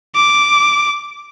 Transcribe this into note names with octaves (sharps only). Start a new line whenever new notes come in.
D6